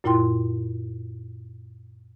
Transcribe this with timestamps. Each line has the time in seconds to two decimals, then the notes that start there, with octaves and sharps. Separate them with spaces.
0.04 F#2 A#2 E4 F4 G5 C6